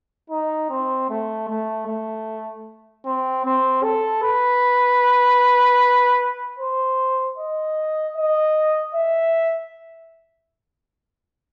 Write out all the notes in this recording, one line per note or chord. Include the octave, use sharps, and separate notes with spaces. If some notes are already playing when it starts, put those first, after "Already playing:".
D#4
C4
A3
A3
A3
C4
C4
A4
B4
C5
D#5
D#5
E5